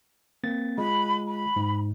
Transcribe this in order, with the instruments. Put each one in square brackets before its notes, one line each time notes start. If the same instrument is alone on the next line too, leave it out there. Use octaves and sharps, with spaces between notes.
[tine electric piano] A#3 C4 A6
[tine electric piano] G#3 F4 [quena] B5
[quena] B5
[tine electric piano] G#2